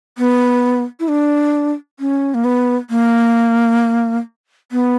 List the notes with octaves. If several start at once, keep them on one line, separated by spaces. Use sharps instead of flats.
B3
E4
D4
C#4
A#3
B3
A#3
B3